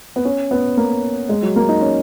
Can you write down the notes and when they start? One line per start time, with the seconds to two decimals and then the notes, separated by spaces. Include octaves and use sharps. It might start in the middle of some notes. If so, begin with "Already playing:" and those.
0.16 B3
0.25 C#4
0.51 B3
0.77 A#3
1.29 G#3
1.42 F#3
1.56 A#3
1.68 D#4
1.82 C#4